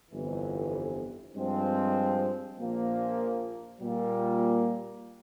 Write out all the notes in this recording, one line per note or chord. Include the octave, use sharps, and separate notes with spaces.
G1 F2 E3
G2 F3 G#3 C4
A#1 A#2 F3 A#3
A#2 G3 A#3